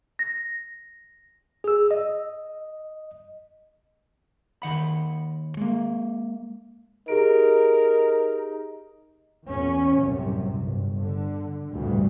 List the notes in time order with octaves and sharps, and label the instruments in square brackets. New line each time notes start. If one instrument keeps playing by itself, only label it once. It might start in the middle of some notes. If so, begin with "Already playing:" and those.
[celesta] A#6
[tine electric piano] G#4 E6
D#5
[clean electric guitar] D#2 D#3 F#5 B5
G#3 A#3
[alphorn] D#4 [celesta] G4 G#4 D7 [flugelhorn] A#4
[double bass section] E2 A#2 C#4
C2 F#2 A2 C3
G1
D3
G1 D2 A2 C3 E3 G3